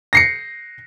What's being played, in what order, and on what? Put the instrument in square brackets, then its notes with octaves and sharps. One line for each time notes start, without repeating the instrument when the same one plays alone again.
[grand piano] A#6 C7 C#7